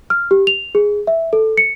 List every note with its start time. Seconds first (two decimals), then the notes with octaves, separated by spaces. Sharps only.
0.10 F6
0.31 G4
0.47 F7
0.75 G#4
1.07 E5
1.33 A4
1.57 C#7